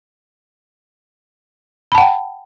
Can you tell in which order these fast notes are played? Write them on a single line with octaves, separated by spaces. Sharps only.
B5 A5 F#5 G5